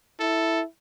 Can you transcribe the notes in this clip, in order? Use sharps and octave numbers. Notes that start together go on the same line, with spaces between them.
E4 A4